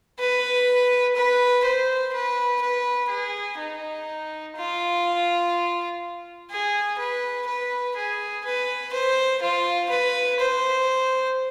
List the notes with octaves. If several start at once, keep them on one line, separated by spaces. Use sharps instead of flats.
B4
B4
C5
B4
B4
G#4
D#4
F4
G#4
B4
B4
G#4
B4
C5
F4
B4
C5